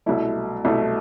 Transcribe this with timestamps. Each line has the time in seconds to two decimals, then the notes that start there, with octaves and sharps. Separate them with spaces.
0.06 C2 B2 A3 E4
0.64 C2 B2 A3 E4